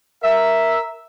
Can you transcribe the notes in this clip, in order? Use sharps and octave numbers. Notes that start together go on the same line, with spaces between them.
A#4 E5